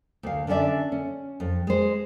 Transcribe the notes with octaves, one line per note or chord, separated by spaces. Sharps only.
D2 F5
D3 C#4 D4 D5 E5
C#4
F2
G#3 C5